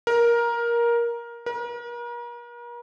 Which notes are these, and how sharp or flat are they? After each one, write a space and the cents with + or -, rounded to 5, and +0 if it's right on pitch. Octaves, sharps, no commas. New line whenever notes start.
A#4 +15
A#4 +40